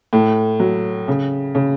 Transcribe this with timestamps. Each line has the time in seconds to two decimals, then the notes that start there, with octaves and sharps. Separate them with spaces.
0.13 A2
0.60 F#3
1.08 C#3
1.55 C#3